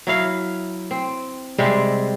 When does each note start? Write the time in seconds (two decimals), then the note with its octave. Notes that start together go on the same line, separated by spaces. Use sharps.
0.07 F#3 E4 F5
0.91 C4
1.58 C3 G3 G#3 C4